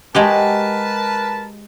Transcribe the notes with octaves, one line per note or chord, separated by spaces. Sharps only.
G#3 F#4 G4 A#4 B4 A5